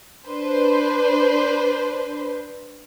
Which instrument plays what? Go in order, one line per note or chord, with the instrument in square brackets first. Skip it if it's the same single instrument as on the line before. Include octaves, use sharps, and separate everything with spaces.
[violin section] D4 B4 C5